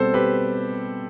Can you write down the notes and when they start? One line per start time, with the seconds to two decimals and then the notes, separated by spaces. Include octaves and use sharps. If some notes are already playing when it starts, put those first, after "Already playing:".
Already playing: B2 G3 C4 A4 C5
0.14 G4 B4